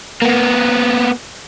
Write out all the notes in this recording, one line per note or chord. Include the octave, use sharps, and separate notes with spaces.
A#3 B3